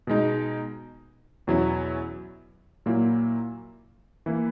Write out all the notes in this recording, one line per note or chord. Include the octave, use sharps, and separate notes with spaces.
B2 G#3 D#4
E2 B2 F#3 C#4 E4
A#2 F#3 A#3 E4
E3 A#3 E4